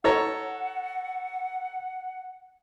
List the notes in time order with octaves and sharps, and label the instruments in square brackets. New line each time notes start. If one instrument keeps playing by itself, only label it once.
[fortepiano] A4 C#5 A#5 [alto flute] F#5